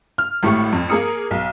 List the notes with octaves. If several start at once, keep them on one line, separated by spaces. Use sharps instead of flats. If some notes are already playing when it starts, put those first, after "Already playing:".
F6
G#1 A2 A3 G4 C#6 C#7
F2
A#3 G#4 A#4 D#6 C#7
B1